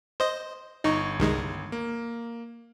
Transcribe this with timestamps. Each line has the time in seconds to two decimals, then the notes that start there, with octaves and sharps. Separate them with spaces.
0.20 C5 D#5
0.84 G1 D#4 C#6
1.20 C2 D#3 G#3
1.72 A#3